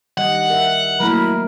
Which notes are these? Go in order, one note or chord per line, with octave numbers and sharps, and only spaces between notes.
D#3 G3 D#5 F#5
A#4 E5
F#3 A3 A#3 E4 A#4 B5